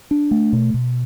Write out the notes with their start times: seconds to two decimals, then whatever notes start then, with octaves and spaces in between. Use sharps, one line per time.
0.11 D4
0.31 A3
0.53 B2
0.74 B2